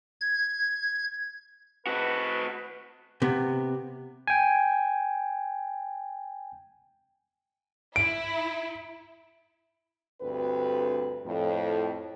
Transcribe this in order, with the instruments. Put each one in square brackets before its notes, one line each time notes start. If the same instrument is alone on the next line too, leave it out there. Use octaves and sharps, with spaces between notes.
[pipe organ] G#6
[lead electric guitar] C4 F#4 [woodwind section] B4
[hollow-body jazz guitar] C3 B3
[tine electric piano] G5 G#5
[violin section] E4 [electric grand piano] D7
[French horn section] D2 G2 C4 A4 B4
F2 A2